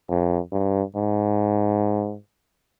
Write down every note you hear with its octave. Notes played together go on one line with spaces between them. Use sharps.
F2
G2
G#2